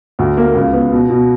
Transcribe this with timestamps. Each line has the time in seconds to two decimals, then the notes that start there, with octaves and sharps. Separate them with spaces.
0.19 D2
0.37 A#3
0.55 C#2
0.73 B3
0.92 B2
1.10 B2